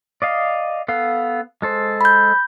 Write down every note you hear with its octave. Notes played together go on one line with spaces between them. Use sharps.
D5 D#5 F5
B3 A4 F5
G#3 A4 C5
B5 G6